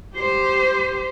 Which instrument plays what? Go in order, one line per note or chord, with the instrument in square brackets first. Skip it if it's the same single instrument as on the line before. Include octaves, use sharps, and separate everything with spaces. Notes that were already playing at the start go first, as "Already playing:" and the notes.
[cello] G4 C5